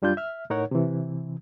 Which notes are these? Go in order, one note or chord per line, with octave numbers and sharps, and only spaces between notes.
F#2 G3 D4 F4 G6
E5 F6
A2 D#4 A#4 C#5 F#5
C3 E3